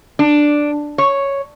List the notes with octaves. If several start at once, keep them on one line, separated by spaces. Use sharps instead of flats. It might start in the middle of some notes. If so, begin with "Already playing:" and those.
D4
C#5